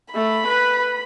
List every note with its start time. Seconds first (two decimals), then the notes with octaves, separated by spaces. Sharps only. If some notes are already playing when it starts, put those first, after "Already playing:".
0.15 A3 B5
0.46 B4